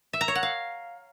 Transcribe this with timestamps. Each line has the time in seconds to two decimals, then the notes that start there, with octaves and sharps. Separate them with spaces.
0.13 E5
0.21 A#5
0.28 C#5
0.35 F#5
0.43 F5